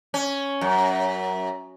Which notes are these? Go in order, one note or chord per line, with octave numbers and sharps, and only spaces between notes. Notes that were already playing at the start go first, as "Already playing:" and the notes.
C#4
F#2